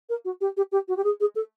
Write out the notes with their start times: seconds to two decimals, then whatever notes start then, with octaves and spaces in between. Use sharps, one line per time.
0.09 A#4
0.24 F#4
0.41 G4
0.56 G4
0.72 G4
0.88 F#4
0.96 G4
1.04 G#4
1.20 G#4
1.35 A4